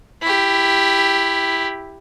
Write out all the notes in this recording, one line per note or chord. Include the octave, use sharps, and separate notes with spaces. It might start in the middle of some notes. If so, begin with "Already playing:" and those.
E4 G4